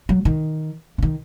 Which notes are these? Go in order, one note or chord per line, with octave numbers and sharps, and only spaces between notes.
F#3
D#3
C#3
D#3